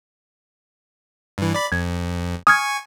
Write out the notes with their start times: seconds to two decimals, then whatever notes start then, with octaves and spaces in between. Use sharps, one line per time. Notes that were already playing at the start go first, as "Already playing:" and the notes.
1.38 G2 E3
1.54 D5 B5
1.72 F2 G#6
2.47 G#5 C#6 D#6 F6 G#6